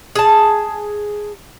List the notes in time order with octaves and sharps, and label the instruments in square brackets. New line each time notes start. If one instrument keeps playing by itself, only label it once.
[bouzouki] G#4 A5